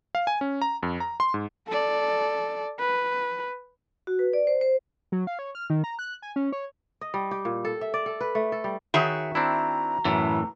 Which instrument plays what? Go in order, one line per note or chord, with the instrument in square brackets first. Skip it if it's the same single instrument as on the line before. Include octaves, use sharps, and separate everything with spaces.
[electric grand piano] F5
G#5
C#4
A#5
F2
A#5
C6
G#2
[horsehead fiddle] A4 D5
B4
[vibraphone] F#4
B4
D5
C5
C5
[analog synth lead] F#3
F5
C#5
F6
D#3
A#5
F#6
G#5
C#4
C#5
[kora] D#5
G3
G4
A#2
A4
E5
D5
A4
B4
A3
A4
G3
[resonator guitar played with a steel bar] D#3 F#4 E5 [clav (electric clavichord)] G#4 C#5 G5
[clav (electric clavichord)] C4 D4 E4 [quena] A#5
[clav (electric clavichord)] F#2 [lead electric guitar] A2 E3